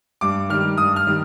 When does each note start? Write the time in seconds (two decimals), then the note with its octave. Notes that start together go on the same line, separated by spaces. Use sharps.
0.21 G2 D6
0.49 D#3 G3 F6
0.78 G2 D#6
0.96 F6
1.07 D#3 G3